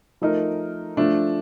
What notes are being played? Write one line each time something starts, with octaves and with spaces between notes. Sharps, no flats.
F3 A3 D#4 A#4
F3 A3 D4